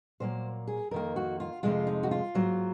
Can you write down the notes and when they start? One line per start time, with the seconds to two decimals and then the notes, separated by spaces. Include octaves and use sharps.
0.20 A#2 F#3 A#3 C5
0.67 G#4
0.91 F2 D#3 A#3 A#4
1.16 F#4
1.40 F4
1.63 F2 C3 F3 G#3 F4
1.87 D#4
2.03 F#4
2.11 F4
2.34 G#2 F#3 A#3